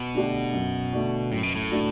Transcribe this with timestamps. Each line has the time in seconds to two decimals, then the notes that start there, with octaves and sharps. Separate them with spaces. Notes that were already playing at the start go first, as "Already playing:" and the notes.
Already playing: B2
0.14 D3 A3 D4 G4
0.53 F#2
0.92 D3 A3 D4 F#4
1.31 F#2 A2
1.43 B2
1.55 A2
1.71 D3 A3 D4 F#4